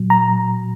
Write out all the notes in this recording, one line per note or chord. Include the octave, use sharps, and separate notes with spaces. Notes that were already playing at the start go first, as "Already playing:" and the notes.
Already playing: A#2 F#3
A#5